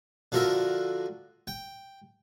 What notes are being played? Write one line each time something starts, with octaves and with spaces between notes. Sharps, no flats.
D3 F3 F#4 A#4 E5
G5